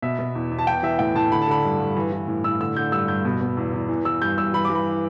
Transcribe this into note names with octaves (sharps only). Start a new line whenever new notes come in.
B2 E5
B2
E2
E2
A5
E3 G5
E3 E5
A2 G5
A2 A5
D3 B5
A5
D3 B5
G2
G2
E3
E3
A2
A2 E6
D3 E6
D3 G6
G2 E6
G2 G6
B2
B2
E2
E2
E3
E3 E6
G2 G6
G2 E6
E3 B5
D6
E3
B5